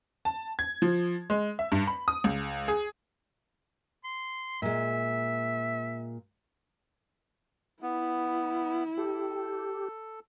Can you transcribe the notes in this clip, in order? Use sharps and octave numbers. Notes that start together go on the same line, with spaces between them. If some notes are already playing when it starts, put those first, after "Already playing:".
A5
G#6
F3
G#3
E5
G2
B5
D#6
C#2
G#4
C6
A#2 G#3 E5
B3 E4
G4 A4